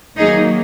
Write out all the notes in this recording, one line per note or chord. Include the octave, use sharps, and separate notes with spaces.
D#3 F#3 A#3 D#4 G#4